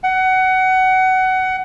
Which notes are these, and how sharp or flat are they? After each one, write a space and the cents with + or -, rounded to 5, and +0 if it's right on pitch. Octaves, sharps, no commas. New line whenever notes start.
F#5 +20